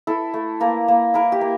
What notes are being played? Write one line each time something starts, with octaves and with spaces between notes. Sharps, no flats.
E4 A4
A3
A#3 A#4
A#3
E4 A#4
G4
A#3